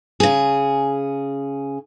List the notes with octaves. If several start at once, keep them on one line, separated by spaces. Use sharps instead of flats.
C#3 G#4